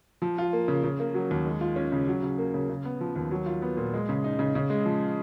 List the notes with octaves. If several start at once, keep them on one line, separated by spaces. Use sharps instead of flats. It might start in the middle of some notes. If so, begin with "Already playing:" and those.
F3
F4
A#3
C#3
C#3
A#3
F#3
D#2
G#3
F4
C#4
C#3
F#3
C#3
A#3
C#3
C#3
B3
F3
D#2
F#3
F4
B3
A#2
G#3
C#3
D#4
C#3
C#3
G#3
F3